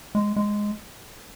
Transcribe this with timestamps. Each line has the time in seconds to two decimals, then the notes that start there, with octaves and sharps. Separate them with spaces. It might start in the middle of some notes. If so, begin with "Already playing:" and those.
0.15 G#3
0.36 G#3